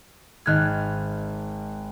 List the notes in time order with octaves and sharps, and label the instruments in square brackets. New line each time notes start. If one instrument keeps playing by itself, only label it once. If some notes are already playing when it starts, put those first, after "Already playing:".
[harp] G#1 F6 [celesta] D#5 F#6 G#6